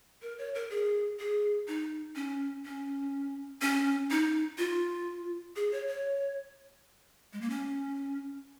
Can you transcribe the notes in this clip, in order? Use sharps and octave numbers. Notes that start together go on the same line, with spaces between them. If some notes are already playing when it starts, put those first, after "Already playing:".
A#4
C#5
A#4
G#4
G#4
D#4
C#4
C#4
C#4
D#4
F4
G#4
C#5
C#5
G#3
A#3
C#4